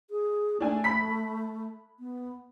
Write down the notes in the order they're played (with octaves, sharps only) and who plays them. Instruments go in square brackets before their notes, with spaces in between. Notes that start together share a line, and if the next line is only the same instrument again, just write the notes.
[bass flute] G#4
[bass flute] A3 [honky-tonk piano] D4 G#5
[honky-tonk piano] B5 B6
[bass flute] B3